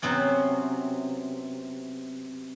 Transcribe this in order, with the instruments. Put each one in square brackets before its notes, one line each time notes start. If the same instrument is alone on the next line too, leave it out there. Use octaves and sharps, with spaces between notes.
[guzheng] C3 F#3 B3 C#4